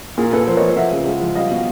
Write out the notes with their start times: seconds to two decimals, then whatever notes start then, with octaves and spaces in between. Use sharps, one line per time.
0.18 A#2 G#4 A#4
0.33 A#2 A4 B4
0.47 F3 A#4 C5
0.57 C#5 D#5
0.62 F3
0.77 F3 E5 F#5
0.92 C#3
1.06 G#3
1.21 F3
1.35 G3 D#5 F5
1.51 B2